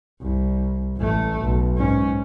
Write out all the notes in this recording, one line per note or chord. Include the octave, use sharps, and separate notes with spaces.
C2
A1 A3
B1
G#2 C#4